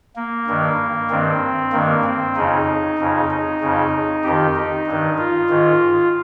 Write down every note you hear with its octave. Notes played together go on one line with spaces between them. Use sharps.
A#3
G2 D#3
G2 D#3 C4
G2 D#3 A#3
C4
F2 C#3 D#4
F2 C#3
D#4
F2 C#3
F2 D#3 G4
D#4
G2 D#3
F4
G#2 D#3